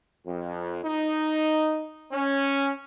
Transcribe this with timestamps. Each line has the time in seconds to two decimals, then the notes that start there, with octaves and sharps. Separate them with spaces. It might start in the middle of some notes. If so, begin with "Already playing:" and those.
0.26 F2
0.84 D#4
2.12 C#4